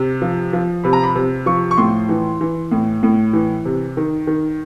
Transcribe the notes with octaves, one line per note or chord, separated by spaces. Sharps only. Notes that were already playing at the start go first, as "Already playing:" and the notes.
Already playing: C3
F3
F3
C3 B5
A#5
B5
C3
F3 C#6
C#6
A2 C6
E3
E3
A2
A2
E3
C3
D#3
D#3